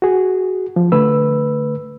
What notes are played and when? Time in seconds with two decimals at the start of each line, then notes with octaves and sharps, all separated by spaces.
0.02 F#4 G#4
0.76 F3
0.92 D3 A3 B4 E6